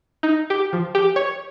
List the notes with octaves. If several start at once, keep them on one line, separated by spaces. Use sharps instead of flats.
D#4
G4
F3
G4
C#5